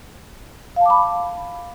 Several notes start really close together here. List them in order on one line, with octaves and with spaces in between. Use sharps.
F5 A5 D6 B5